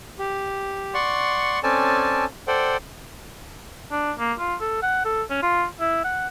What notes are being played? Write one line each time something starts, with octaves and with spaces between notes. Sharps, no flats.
G4
D5 F#5 C6 C#6
C4 C#4 A4 D5 G#5 A5
A4 C5 D5 F#5 G5
D4
A#3
F4
A4
F#5
A4
C#4
F4
E4
F#5